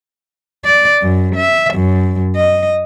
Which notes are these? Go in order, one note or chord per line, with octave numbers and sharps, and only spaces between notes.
D5
F#2
E5
F#2
D#5